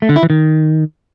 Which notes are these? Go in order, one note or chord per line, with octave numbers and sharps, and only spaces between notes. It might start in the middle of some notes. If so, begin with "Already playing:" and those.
A3
D3
E4
E3
D#3